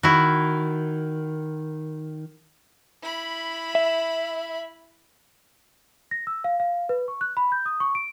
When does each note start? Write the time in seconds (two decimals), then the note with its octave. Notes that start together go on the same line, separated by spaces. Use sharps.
0.03 D#3 E4 F#4
3.02 E4 B5
3.75 E5
6.11 A#6
6.27 E6
6.44 F5
6.60 F5
6.89 B4
7.08 C#6
7.21 F#6
7.37 B5
7.52 G6
7.66 D#6
7.80 C#6
7.95 D7